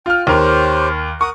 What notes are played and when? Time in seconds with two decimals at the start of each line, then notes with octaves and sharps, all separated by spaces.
0.06 F4 G5 F6
0.27 D#2 G4 A#4 C5 C#5
1.21 A#4 F#5 C#6 D#6